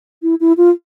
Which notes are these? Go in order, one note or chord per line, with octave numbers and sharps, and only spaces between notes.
E4
E4
F4